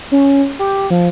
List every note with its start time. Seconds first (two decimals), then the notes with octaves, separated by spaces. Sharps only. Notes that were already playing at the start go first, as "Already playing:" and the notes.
0.12 C#4
0.59 G4
0.90 F3